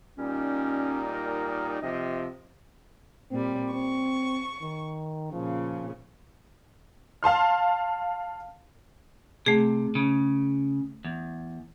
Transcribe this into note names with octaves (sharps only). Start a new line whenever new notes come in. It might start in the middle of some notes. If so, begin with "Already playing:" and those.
A#2 G3 C#4 D#4
A#4
C3 F3 D#5
A#2 G3 C4
C4 C#6
D#3
A#2 C#3 F3
F5 A5 C6 F6
C3 A3 G#4
C#3
E2